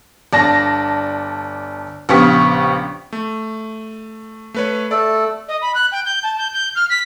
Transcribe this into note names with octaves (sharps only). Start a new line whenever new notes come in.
G1 D5 A5 A#6
A#1 C#3 B3 G4 C#6 B6
A3
A3 B4 C#5
A3 A4 D5
D#5
B5
F#6
G5
G6
A5
G6
G6
F6
B6